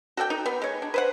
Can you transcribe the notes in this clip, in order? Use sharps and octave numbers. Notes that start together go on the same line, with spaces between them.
F#4 A4 D5 G5
D#4
B3
G#3 C#5
D4
B4 C5 F#5